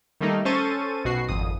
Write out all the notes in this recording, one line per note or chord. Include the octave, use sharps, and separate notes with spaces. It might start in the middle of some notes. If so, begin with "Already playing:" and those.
D#3 G3 A3 A#3 D#4
C#4 A4 C5 C#6 A6 D#7
B1 B2 F#4 C7
G#1 F2 D#6